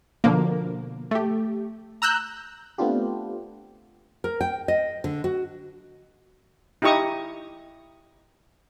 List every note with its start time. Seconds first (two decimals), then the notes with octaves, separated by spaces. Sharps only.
0.24 B2 D3 F3 A#3
1.11 A3 G4
2.02 A#5 E6 F#6 G6
2.78 A3 B3 C4 D4 F4 G4
4.24 A#4
4.41 G5
4.68 D#5
5.04 D3
5.24 F#4
6.82 D#4 E4 G4 D#5 C#6 D#6